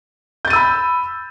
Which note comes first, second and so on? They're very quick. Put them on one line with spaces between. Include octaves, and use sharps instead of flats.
G6 A6 D#7 E6 B5